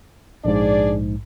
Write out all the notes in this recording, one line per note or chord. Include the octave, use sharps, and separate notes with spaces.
A#1 G#2 D4 G#4 D5